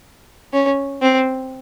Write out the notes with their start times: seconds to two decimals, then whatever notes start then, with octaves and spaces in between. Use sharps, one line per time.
0.53 C#4
1.02 C4